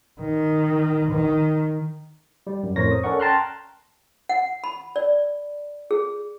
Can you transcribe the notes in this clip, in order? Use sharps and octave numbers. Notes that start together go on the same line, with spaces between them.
D#3
D#3
G3
F#2
F2 A2 A#4 C5 C#5 A#6
D#6
C#4 A4 A#4 D5 F#5 C#6
G5 A5 A#5 C6 F6 F#6
F#5
B5
D5
G#4